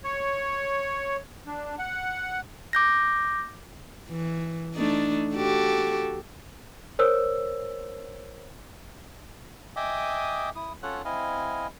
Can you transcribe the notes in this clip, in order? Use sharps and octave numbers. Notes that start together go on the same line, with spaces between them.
C#5
D4
F#5
D6 G6 A#6
E3
A3 D4 D#4
F#4 G4 A4
A#4 C5 C#5 E6
D#5 E5 G5 G#5 D6 D#6
E4 D#6
C#4 F4 A4 C#5 F#5 F#6
C4 E4 D#5 F5 G#5